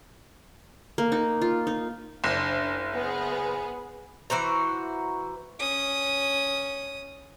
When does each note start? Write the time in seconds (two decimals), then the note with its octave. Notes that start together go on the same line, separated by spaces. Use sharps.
0.98 A#3
1.12 D#4
1.41 F4
1.67 D#4
2.24 F#1 D4 C5
2.92 B3 G#4
4.30 E3 F#4 C5 A#5
5.60 C#4 D#6